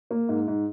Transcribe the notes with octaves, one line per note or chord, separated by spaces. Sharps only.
A#3
G#2
G#2